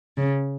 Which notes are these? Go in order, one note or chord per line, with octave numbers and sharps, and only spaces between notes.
C#3